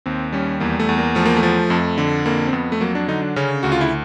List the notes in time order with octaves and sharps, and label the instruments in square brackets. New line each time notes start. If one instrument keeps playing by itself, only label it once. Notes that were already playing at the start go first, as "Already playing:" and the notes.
[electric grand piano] D#2 C4
G3 C#4
E2 A#3
A3
E2
A#3
F3 A3
A#3
A3
F3
F2
D3
F2 A#3
C4
F2 B3
A3
F#3 A#3
D4
D3 D#4
D4
C#3 C#4
D2 F#4
F4
E4